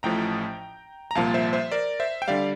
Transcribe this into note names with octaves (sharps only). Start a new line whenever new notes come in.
A1 A2 F3 G5 A#5
A#5
C2 A#2 F3 F5 A5
C5 E5
C5 E5
A#4 D5
C5 E5
G5
D3 G3 D5 F5